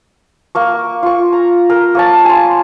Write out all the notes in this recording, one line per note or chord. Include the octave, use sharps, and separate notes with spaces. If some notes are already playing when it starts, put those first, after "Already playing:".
A#3 A#4 C#6
F4 C#6
A#5
A#4
A#3 C#5 A5
G#5 C6